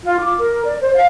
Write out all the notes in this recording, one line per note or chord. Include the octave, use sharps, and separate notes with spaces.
F4
D6
A#4
D5
C5
F5